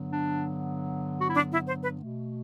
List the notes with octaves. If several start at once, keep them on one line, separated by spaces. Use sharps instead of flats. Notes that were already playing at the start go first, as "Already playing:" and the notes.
Already playing: G2 D3 F#3 B3
D4
F#4
E4
D4
E4
C5
B4
B2 A3